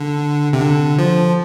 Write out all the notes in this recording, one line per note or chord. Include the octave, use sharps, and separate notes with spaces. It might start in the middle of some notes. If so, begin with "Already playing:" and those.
Already playing: D3
C3
D3
F3